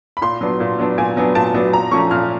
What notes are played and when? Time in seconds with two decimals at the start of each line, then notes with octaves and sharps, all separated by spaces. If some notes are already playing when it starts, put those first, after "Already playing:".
0.17 B5
0.22 A#2 C6
0.41 F#3 B3 D4
0.60 A#2
0.79 F#3 B3 D4
0.98 A#2 G#5
1.17 F#3 B3 D4
1.35 A#2 A5
1.54 F#3 B3 D4
1.73 A#2 A#5
1.91 F3 A3 C#4 C#6
2.11 A#2 F6